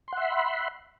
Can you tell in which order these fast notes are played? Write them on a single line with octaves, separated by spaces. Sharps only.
C6 F#5 E5 B5